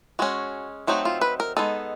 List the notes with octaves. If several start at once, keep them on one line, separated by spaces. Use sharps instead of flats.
G#3 C#4 F#4
F#3 A3 C4 D#4 F#4
F4
B4
A#4
G#3 B3 D#4 A4